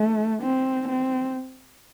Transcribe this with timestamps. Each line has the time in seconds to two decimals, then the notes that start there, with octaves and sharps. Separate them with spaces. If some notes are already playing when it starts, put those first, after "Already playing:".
Already playing: A3
0.43 C4
0.88 C4